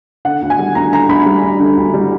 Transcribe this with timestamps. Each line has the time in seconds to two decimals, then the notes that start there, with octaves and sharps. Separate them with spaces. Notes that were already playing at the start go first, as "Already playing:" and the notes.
0.25 D3 F#5
0.42 D2
0.50 G#5
0.59 G3
0.75 D2 A#5
0.92 D3 A#5
1.09 D2 B5
1.26 G3
1.44 D2
1.60 D3
1.77 D2
1.94 G3